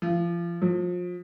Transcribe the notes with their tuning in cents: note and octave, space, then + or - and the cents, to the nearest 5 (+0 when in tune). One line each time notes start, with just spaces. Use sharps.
F3 -30
F3 +30